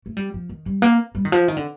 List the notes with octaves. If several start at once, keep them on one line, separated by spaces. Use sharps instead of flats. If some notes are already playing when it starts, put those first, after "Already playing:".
A3
G3
F3
D#3
G3
A#3
G3
D#3
F3
D#3
D3